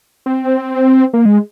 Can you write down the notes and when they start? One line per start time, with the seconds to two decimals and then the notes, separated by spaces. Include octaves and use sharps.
0.26 C4
1.13 A#3
1.25 G#3